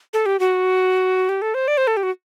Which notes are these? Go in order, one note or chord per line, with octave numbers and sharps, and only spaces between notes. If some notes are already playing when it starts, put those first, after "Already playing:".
A4
G4
F#4
G4
A4
C5
D5
C5
A4
G4
F#4